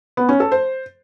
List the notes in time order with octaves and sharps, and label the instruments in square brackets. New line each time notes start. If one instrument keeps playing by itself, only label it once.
[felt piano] B3
C#4
A4
C5